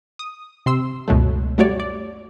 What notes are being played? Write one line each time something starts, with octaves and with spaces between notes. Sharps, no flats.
D#6
C3 C6 E6
C#2 F#2 B2 F#3 A3
G3 A3 F#4 C#5 D5
D5